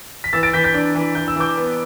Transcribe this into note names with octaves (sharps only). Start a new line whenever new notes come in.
B6
E3 E6 A6
A6 D7
E3 G6 B6
G6 B6
D4
E3
E3 G6
E6
E3 D6 G6
B3